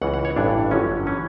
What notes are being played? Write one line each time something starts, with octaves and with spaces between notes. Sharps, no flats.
C#2 C#3 E3 F#5
F#5
C#5
A1 G2 E3 D4
G1 F#2 D3 F#3 C#4
E3 C#4